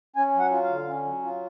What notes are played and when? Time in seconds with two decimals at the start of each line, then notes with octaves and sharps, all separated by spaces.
0.16 C#4 G#5
0.35 F#3 F#5
0.51 F4
0.64 F5
0.69 D3
0.87 C#4
1.04 F#3
1.23 F4